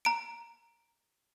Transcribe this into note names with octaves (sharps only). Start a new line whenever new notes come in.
A#5 D7